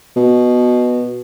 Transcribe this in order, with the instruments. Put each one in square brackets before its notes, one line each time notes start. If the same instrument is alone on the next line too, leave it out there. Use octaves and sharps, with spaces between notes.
[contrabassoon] B2